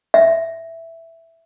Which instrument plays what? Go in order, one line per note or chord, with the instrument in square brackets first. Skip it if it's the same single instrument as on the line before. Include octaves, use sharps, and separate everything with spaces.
[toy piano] E5